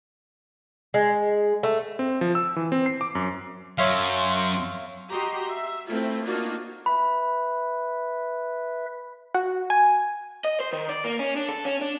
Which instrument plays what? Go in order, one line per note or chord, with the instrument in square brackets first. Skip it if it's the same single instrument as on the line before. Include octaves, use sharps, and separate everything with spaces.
[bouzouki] G#3
A3
[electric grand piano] C4
F3
E6
E3
C4
C7
D6
F#2
[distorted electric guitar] F#2 [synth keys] C#5 E5 F5 [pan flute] C6
[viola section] F#4 G4 D#5 A#5 C6
E5
A3 C4 E4 F4
A#3 D4 D#4 F4 F#4
[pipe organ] B4 E5 [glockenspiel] B5
[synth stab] F#4
G#5
[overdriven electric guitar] D#5
C5
D#3
D5
A#3
C#4
D4
A4
C#4
D4